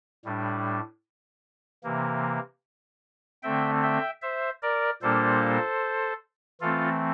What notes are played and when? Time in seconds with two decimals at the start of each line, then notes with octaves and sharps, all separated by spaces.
0.25 A2 G3 D4
1.84 C3 E3 A#3
3.43 D3 A3 C4 E5 G5
3.83 E5 G5
4.22 C5 E5
4.62 A#4 D5
5.02 A#2 G3 A#3 D4 A4 C5
6.61 E3 A3 C4 F4 A4